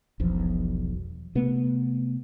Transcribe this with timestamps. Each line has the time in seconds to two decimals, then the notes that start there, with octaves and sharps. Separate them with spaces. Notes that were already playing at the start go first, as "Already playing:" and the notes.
0.20 E1 B1 E2 F3
1.35 C3 A3 B3